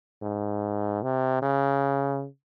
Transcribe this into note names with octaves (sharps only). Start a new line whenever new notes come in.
G#2
C3
C#3